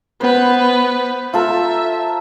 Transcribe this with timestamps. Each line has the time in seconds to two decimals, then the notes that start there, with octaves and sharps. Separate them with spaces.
0.21 B3 B4 C5
1.34 F4 A4 A#4 E5